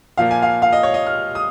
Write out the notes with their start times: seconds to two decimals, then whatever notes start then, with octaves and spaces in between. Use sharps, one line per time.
0.18 A#2 F3 A#3 F5
0.31 G#5
0.42 F5
0.62 F5
0.73 D#5
0.83 C#5
0.94 D#5
1.06 F6
1.35 D#6